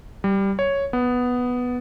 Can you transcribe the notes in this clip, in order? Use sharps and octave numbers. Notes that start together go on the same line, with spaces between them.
G3
C#5
B3